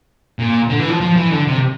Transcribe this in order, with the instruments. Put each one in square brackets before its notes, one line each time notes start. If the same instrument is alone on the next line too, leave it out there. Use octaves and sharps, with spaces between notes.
[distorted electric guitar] A#2
D3
E3
F3
F3
E3
D3
C3